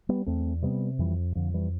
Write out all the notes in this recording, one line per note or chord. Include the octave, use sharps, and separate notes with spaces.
G3 B3
E2 A3 C4
C3 G3 B3
F2 E3 G3
F2 D3 F3
E3 G3